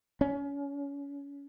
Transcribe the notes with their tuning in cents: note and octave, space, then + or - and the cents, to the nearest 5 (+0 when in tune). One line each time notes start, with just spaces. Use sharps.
C#4 +30